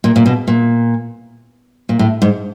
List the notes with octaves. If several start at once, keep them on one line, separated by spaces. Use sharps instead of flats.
A#2
A#2
B2
A#2
A#2
A2
G#2